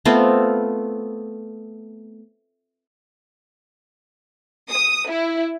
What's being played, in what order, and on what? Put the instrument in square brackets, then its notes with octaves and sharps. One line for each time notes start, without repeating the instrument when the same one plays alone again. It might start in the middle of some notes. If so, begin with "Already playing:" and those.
[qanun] A3 B3 C4 F4
[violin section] D#6
E4